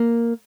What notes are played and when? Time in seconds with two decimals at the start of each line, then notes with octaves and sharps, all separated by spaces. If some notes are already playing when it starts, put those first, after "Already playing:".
Already playing: A#3